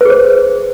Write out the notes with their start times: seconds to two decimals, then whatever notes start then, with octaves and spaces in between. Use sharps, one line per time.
0.01 B4
0.05 G#4
0.10 C5